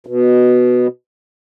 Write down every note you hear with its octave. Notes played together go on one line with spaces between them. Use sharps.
B2